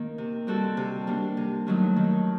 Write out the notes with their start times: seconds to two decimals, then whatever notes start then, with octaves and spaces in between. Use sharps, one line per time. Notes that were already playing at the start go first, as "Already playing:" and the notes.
Already playing: D#3 A#3
0.18 C3
0.47 G3 C4 F#4 A4
0.77 C3
1.07 G3 A#3 D4
1.37 C3
1.67 D#3 F#3 A3 D#4
1.96 D#3